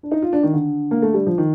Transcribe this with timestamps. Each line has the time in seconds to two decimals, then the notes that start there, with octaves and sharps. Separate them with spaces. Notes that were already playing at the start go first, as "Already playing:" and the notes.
0.03 D4
0.12 D#4
0.22 F4
0.33 D4
0.43 D#3
0.53 D3
0.91 A#3
1.02 A3
1.14 G3
1.27 F3
1.38 D#3